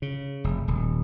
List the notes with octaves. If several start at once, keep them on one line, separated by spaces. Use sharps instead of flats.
C#3
F1
D#1